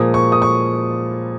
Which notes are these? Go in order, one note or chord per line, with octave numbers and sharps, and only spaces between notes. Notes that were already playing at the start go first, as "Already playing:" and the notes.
Already playing: A#2 F3 G#3 D#6
C#6
D#6
C#6